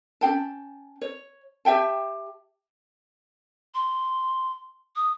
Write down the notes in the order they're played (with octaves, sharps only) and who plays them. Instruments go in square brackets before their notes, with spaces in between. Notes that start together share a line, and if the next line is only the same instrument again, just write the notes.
[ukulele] C#4 G#4 G5 A5
C#5
G4 E5 G5 A5
[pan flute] C6
D#6